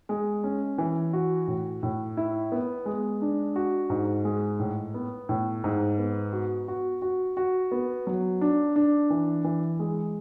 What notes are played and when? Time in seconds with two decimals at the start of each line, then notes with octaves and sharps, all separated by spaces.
0.09 G#3
0.44 C#4
0.78 E3
1.13 F#4
1.48 A2
1.83 A2
2.17 E4
2.52 B3
2.86 G#3
3.22 D4
3.56 F#4
3.90 G#2
4.25 G#3
4.60 A2
4.94 B3
5.29 A2
5.64 G#2
5.98 B3
6.33 F#4
6.68 F#4
7.02 F#4
7.37 F#4
7.72 B3
8.07 F#3
8.41 D4
8.76 D4
9.10 E3
9.44 E3
9.79 G#3